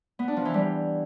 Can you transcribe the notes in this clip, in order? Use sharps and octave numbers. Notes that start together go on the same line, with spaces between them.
B3
D4
F3
E3
G3